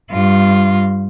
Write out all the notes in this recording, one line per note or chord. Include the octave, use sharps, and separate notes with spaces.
G2 F4